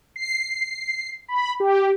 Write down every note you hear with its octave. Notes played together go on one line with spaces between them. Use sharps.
C7
B5
G4